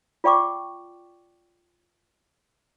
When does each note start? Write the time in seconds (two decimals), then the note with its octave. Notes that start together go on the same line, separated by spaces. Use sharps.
0.24 F4 D5 G5 C#6 D6